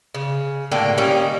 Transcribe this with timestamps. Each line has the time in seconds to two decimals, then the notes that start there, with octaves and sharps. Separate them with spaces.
0.15 C#3
0.72 A2 D3 A#3 G4
0.98 G3 A#3 C#4 D#4